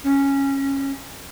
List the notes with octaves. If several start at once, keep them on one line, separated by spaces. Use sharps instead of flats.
C#4